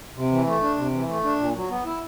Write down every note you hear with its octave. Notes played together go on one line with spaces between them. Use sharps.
C3
E3
A3
D4
C3
E3
A3
D4
A#2
F#3
B3
E4